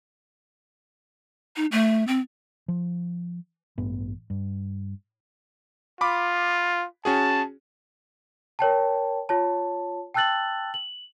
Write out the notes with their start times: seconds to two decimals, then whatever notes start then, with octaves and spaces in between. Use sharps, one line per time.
1.56 D#4
1.72 A3
2.07 C4
2.68 F3
3.78 A1 G2 B3
4.30 G2
6.01 F4 B5 D6
7.05 C#4 F#4 G#4 A5
8.59 A#4 C#5 G5 A5
9.29 F4 C#5 A5
10.14 G5 A5 E6 F#6 A6 F#7
10.74 F#7